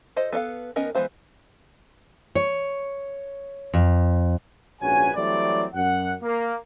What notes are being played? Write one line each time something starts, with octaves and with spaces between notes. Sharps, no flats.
F4 A4 C5 D#5
B3 A4 E5 F5
D#3 B3 C#4 A#4 D#5
E3 G#3 B3 C5 F5
C#5
F2
A#1 G#2 C#4 F#4 B4 G#5
E3 F#3 G3 A3 C4 D5
F#2 F#5
A#3